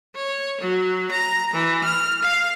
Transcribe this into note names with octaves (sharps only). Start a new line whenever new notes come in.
C#5
F#3
A#5
E3
F6
F5